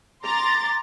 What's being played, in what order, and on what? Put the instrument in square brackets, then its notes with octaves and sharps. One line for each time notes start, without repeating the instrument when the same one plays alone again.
[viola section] A#5 [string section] C6 D6 A6